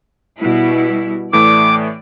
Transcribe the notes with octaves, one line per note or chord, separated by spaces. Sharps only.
B2 G3 E4
A2 E3 A3 D5 D6